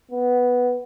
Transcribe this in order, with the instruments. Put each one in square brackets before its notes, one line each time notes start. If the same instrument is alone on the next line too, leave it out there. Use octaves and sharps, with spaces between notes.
[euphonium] B3